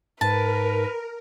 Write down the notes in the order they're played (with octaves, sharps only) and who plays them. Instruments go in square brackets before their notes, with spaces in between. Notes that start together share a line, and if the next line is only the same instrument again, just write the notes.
[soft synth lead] G#2 [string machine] A#4 [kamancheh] B4 [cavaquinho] A5